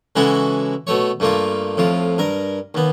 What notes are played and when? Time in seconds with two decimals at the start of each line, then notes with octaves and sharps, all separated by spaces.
0.16 C#3 E3 G#3 E4 F#4 A4
0.87 B2 A3 C#5
1.20 G2 A3 A#3 F4
1.77 F2 A2 F4
2.18 G2 A#4
2.74 D#2 B3